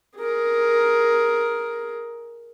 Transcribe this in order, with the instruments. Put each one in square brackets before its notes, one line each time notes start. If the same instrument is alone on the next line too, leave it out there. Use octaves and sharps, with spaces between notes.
[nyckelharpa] G#4 A#4